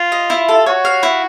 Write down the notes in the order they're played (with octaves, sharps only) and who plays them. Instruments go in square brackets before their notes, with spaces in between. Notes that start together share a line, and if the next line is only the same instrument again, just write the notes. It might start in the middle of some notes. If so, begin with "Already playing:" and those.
Already playing: [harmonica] F4
[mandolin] D#5
E4
A4
[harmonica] F#4 [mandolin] C#5
[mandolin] F5
E4